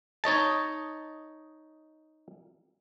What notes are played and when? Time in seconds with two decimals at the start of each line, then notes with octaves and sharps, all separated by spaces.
0.24 D#4 C#5 D#5 A5